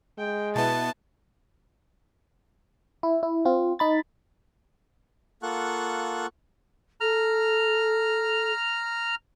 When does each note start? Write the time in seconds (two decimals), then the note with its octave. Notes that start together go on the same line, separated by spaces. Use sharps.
0.18 G#3 G5
0.56 B2 B3 E4 A5
3.03 E4
3.23 E4
3.45 C4 F4
3.79 D#4 B5 A6
5.43 A#3 F4 A4 F#5 C#6 F#6
7.01 A4 A#5 F6